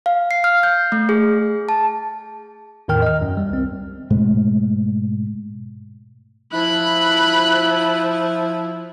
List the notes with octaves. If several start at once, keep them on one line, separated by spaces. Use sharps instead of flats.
F5
C7
F6
G6
A3
G#4
A5
E2 A2 D#3 A#4 G5 F6
D#5 F6
F#2
G3
C2 C4
G#2 B2 G#3 A3
F3 E4 B5 F#6